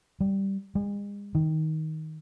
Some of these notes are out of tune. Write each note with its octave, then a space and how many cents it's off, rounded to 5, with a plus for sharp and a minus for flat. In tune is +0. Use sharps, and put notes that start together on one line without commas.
G3 -5
G#3 -40
D#3 +15